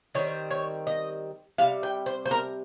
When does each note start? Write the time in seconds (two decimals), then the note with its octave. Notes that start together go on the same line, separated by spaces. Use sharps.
0.15 D#3 G3 C4 C#5
0.51 C#5
0.87 D#5
1.58 C3 G3 F5
1.83 G5
2.06 C5
2.26 C5
2.31 A#4